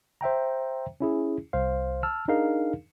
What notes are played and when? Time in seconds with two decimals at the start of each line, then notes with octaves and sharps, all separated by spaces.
0.21 C5 E5 G5 A#5
1.00 C#4 E4 G#4
1.53 C2 C5 F5
2.03 A5 E6 F6
2.28 D4 D#4 G#4 A#4 F5